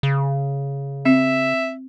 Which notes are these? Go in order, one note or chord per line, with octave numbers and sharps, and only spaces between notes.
C#3
C4 E5